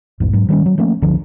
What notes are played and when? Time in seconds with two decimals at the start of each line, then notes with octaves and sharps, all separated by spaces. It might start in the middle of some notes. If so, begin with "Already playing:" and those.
0.20 A#1 E2 G#2
0.33 G#2 F#3
0.49 D#3 G3 C4 C#4
0.66 F#3
0.78 F3 A3 A#3 C#4
1.02 C#2 D3 F3